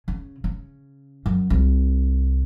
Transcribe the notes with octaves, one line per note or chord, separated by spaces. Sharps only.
C#3
C#3
F#2
C2